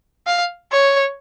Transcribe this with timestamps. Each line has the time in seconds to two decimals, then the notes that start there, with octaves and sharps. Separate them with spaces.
0.27 F5
0.72 C#5